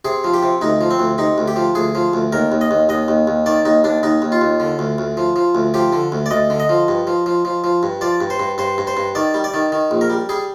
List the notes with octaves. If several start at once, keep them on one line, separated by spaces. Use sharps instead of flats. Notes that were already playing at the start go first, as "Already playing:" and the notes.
C3 G#4
F3
G4
C3
D2 D#4
F3
C4
D2
C3 D#4
D2
G4
F3
D2 G#4
F3
D2
D#2 A#4
D#2
D#5
D#2
D#2 D#5
D#2
D#2
D#3 D5
D#2 D#4
D#2 D4
D#2 D#4
D#2
F4
D#2
D3
D2
D2
F3
F3
D2
F3 G4
D3
D2
D5
D2 D#5
D3
D#5
F3
G2
F3
F3
F3
F3
G2
F3 D5
G2
C5
G2
G2 C5
G2
C5
G2
D#3 D5
G3
D5
D#3
D#3
A#1
A#4
G3
G3 G#4